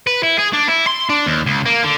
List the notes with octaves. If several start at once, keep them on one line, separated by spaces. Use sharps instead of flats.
B4
E4
G#4
D4
E4
C6
D4
D#2
C#2
A#3
D3